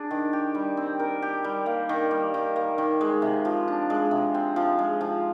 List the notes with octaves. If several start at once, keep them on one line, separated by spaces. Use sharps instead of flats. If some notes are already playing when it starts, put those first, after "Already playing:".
Already playing: D4 G#4
D#3
G4
G3
C4
A#4
G4
G3
A#3
D#3
G3
D#3
A#3
D#3
G#3
C3
F3
D4
G#3
C3
C4
F3
G#3
F3